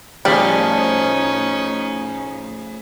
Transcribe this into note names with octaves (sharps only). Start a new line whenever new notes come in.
A2 C#3 F3 G3 C#4 D#4